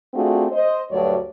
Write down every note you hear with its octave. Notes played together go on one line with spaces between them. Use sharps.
A3 C4 D4 F4 F#4 G#4
C5 D#5
D2 G2 F#3 F#4 C#5 D5